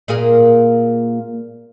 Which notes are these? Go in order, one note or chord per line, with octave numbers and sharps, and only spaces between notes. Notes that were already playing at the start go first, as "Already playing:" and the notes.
A#2 A#3 G#4